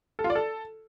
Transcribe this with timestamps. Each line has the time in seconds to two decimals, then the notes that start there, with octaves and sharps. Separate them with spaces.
0.19 A4
0.24 F4
0.30 D5
0.35 A4